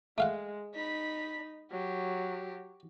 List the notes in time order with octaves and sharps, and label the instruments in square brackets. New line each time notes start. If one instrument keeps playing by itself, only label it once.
[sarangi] G#3 [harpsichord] A3 F5 F#5
[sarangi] D#4 [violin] B5 B6
[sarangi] F#3 [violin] G4